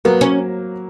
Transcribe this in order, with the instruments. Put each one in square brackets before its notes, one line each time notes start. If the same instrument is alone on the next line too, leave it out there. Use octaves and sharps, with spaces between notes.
[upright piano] F#3 A#3 [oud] B3
[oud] C#4